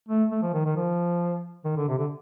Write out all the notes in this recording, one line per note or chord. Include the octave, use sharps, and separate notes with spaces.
A3
A3
F3
D#3
D#3
F3
D#3
D3
C3
D3